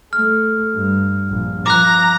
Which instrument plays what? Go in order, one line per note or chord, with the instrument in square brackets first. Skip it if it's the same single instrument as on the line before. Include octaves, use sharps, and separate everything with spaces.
[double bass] A3 [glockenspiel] F6
[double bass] G2
A#1
[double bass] F3 [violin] A#5 [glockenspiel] D6 F#6